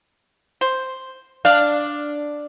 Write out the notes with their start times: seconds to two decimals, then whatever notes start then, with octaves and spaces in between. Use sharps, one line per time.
0.61 C5
1.45 D4 F5